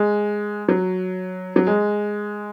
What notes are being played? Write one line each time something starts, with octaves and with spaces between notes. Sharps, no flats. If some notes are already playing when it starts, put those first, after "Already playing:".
Already playing: G#3
F#3
F#3
G#3